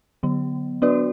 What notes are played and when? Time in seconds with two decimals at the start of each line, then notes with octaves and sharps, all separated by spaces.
0.23 D3 F#3 B3
0.82 B3 D4 F#4 B4 D5